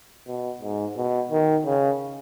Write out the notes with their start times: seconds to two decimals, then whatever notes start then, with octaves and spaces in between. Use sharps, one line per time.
0.28 B2
0.61 G#2
0.97 B2
1.31 D#3
1.66 C#3